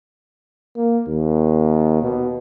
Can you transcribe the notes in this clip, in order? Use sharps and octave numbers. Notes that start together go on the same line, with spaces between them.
A#3
D#2
B2